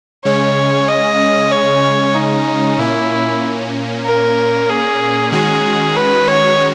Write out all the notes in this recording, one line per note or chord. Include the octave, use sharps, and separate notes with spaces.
C#3 G#3 C#4 C#5
D#5
C#5
D#4
A#2 A#3 C#4 E4
A#4
G#4
D#3 G#3 C#4 F#4 G#4
B4
C#5